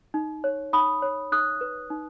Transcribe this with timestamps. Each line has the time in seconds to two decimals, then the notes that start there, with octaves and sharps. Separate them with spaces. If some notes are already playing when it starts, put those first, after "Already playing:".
0.14 D#4
0.44 C#5
0.73 D#4 B5 D#6
1.02 C#5
1.32 D#4 D#6 F#6
1.61 B4
1.90 D#4